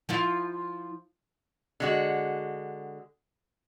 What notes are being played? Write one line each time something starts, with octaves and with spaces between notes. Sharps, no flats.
F3 E4 F4
D3 G#3 F#4